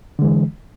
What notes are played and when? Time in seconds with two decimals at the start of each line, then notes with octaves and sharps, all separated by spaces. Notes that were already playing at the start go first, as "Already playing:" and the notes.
0.19 D3
0.22 G#3
0.25 E3